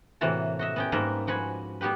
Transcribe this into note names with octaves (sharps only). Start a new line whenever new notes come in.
A2 C3 E3 A#3 F#4 A5
F#4 D#5 E5
B3 C#4 G5
G#2 G3 A#3 A#4 B4 A5
F3 F#4 B4 G#5 B5
G3 B3 F#4 G4 B4